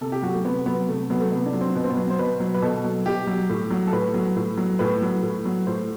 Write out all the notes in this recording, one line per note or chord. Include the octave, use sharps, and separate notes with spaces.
C3 A4
G4
F#3 F#4
A3
C3 B3
F#3 B3
C3 A3
F#3 B3
A3
C3 B3
D4
F#3
C4
B2 B3
C4
B3
F#3
C5
B2 B4
F#3
B4
B2 A4
F#3
B2 G4
F#3
A2
F#3
A4
A2 B4
F#3
A2
F#3
A2 B4
F#3
A2
F#3
A2 C5